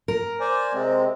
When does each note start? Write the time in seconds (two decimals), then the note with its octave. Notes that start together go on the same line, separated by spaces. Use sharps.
0.08 A#4
0.40 C5 D5 G#5
0.74 C3 G#3 C4